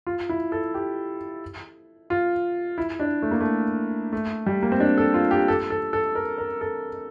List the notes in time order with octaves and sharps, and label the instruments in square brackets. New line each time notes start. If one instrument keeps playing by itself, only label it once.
[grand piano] F4
E4
A4
G4
F4
E4
D4
A3
A#3
A3
A3
G3
A#3
C4
D4
A4
F4
G4
A4
A4
A4
A#4
A#4
A4